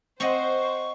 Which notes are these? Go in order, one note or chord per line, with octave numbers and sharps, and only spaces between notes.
C4 C5 D#5 F#5 C#6